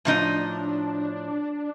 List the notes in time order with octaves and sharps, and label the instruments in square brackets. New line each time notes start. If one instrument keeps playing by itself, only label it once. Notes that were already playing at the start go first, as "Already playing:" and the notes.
[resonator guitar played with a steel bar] A2 F3 D#4 [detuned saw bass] D4